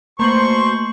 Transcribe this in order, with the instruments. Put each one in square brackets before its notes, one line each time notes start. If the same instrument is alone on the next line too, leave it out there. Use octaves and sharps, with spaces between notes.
[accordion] B2 C5 C6 [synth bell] A3 A#3 F#7 [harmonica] C#6